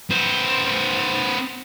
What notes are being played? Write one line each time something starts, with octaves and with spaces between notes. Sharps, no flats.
B3 C5